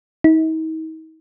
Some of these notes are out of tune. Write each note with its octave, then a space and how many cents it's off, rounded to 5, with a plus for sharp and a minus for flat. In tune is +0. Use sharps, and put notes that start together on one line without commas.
D#4 +40